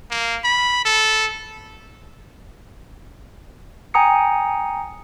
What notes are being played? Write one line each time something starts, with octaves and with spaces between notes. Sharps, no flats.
A#3
B5
A4
G5 G#5 A#5 D#6 C#7